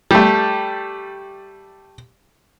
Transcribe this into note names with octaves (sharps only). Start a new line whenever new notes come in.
G3 A3